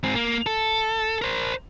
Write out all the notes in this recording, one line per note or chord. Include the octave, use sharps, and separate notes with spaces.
G#2 C4
A#3
A4
A#4 C5